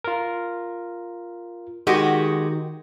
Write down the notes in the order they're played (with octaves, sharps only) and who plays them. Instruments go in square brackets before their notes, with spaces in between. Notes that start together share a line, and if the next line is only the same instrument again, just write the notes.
[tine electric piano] F4 A#4
[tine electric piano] D#3 [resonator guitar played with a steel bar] G#3 F#4 G4